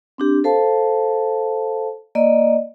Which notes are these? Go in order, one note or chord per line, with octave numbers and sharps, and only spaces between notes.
C4 D4 G4
A4 C5 F5 A5
A#3 D5 D#5